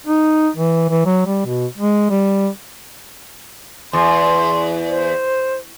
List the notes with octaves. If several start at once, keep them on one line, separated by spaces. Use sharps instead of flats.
D#4
E3
E3
F#3
G3
B2
G#3
G3
E2 C6
C5